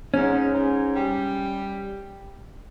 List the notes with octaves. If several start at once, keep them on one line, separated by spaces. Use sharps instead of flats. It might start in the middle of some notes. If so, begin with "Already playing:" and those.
G#2 C#4
G#2
G3